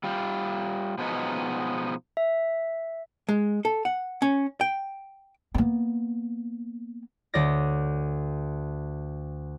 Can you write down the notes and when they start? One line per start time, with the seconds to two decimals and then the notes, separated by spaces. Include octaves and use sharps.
0.04 G3 F4
0.98 B2 F3 G#3 B3 D#4
2.17 E5
3.29 G#3
3.65 A4
3.85 F#5
4.22 C#4
4.61 G5
5.54 A#3 B3
7.34 D2 A4 C#5 D5 A6 A#6